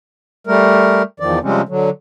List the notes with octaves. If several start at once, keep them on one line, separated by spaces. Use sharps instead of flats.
G3 A3 A#4
E2 D#3 F3 D5
C3 F3 G3 G#3 C4 C#4
D3 F#3